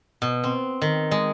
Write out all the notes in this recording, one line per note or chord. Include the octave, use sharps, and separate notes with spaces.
B2
C4
D#3
G#3